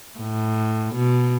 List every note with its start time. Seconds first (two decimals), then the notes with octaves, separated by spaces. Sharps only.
0.19 A2
0.94 B2